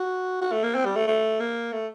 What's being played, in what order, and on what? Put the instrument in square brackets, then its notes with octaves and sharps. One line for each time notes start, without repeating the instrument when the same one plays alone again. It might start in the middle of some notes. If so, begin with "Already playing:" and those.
Already playing: [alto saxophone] F#4
F#4
A3
A#3
C4
G3
A3
A3
A#3
A3